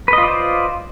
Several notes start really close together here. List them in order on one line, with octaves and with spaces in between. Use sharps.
B4 D#5 F4 D5 C5